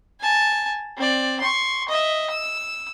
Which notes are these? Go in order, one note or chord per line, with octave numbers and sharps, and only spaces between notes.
G#5 A5
C4 D5
C6 C#6
D#5 E5
E6